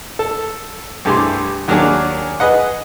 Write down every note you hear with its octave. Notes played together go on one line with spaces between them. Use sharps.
A4
C2 G2 A3 G4 G#4 C6
D#2 F#3 A#3 D4 G#4
G#4 B4 D#5 F#5